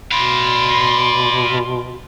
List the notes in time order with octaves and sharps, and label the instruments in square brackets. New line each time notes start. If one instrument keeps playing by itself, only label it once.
[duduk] B2 [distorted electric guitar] D5 F5 [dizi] B5 [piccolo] C6